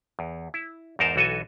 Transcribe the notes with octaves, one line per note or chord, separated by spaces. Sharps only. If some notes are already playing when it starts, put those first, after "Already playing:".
E2
E4
E2 G#2 D#4 A#4 C5 A5
B1 E3 F#4 A4 D#5 G#5